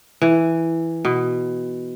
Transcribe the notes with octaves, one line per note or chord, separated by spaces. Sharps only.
E3
B2